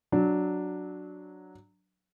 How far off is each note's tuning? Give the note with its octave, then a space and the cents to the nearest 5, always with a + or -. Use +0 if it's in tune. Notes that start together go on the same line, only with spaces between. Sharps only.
F#3 +0 D4 +0